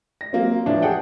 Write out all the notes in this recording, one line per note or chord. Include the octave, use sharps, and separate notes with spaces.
A#6
F#3 A#3 C4
A2 E3 F3 D4
G#4 A4 F#5 G5